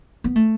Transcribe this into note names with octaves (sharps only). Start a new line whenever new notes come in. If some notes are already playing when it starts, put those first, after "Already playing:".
B3
A3